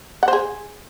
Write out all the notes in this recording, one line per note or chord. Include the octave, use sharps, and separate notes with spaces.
F#5
C5
G#4